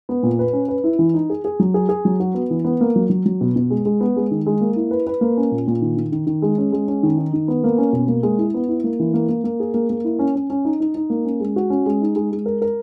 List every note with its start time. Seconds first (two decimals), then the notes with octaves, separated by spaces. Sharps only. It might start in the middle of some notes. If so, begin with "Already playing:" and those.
0.09 B3
0.23 A#2
0.39 B4
0.53 C#4
0.68 B4
0.84 E4
0.99 E3
1.14 D#4
1.30 G#4
1.45 G#4
1.60 F#3
1.74 G#4
1.89 G#4
2.05 F#3
2.20 F#4
2.34 B3
2.50 E3
2.65 B3
2.81 A#3
2.96 F#3
3.10 F#3
3.26 F#3
3.41 B2
3.56 B2
3.70 G#3
3.85 G#3
4.01 B3
4.16 G#3
4.31 D#3
4.46 G#3
4.61 A#3
4.76 E4
4.91 B4
5.07 B4
5.21 A#3
5.37 C#4
5.51 A#2
5.67 A#2
5.81 D#3
5.96 D#3
6.12 D#3
6.27 D#3
6.42 G#3
6.58 C#4
6.72 G#3
6.88 C#4
7.03 D#3
7.18 D#4
7.34 D#3
7.48 B3
7.64 A#3
7.78 C#4
7.93 B2
8.08 A#3
8.23 G#3
8.38 E4
8.54 B3
8.68 E4
8.84 A#3
9.00 E3
9.14 A#3
9.29 A#3
9.44 A#3
9.60 G#4
9.74 A#3
9.90 A#3
10.04 E4
10.19 C#4
10.35 C#4
10.50 C#4
10.65 D#4
10.80 D#4
10.95 D#4
11.10 A#3
11.25 C#4
11.40 G#3
11.56 F#4
11.70 C#4
11.86 G#3
12.01 D#4
12.16 G#3
12.31 G#3
12.46 A#4
12.62 A#4